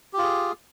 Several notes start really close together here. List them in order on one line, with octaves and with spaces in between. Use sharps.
G4 F4 G#4